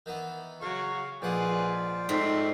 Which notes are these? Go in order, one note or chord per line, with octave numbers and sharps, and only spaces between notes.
D#3 E3 B3
C#3 F#3 F5 C#6
A#1 G#2 F4 G#4 B4 C5 D5 F#5
G#2 A3 C4 C6